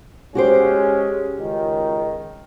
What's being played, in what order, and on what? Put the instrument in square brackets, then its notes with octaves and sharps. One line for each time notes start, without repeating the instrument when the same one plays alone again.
[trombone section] G#3 C#4 [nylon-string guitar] F#4 G4 C5
[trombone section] C#2 D#3